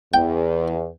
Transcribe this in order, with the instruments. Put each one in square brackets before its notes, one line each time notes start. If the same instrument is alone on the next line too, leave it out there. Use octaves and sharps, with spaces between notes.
[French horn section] E2 [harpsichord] G5